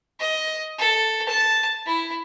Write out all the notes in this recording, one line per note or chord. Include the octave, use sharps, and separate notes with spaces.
D#5
A4
A5
E4